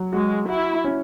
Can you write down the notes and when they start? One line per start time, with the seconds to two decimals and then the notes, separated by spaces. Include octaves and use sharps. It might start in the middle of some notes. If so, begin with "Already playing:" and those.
Already playing: F#3
0.13 G#3 F#4
0.48 E4 F#4
0.84 C#4